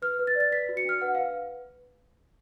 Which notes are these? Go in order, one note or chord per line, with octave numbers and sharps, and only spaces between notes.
B4 F6
B4
A6
D5
A6
B4 B6
F#4
C#7
D4 F6
B4 F#5
F5
B4